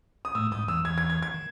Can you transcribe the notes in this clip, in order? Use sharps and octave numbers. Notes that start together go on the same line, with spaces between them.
D#6
A2 A3 E6
G#2 G#3 D#6
E2 E3 E6
E2 E3 G#6
G#6
G#6
G#6
D#3